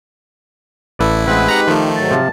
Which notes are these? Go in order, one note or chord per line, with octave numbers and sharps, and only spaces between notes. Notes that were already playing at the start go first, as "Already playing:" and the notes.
A1 E4 A4 B4 D5
G#3 C4 B4 F#5
D#4 G4 F#5 A#5
D#3 F3 A3
G#2 F#3 A5
C3 F3 F5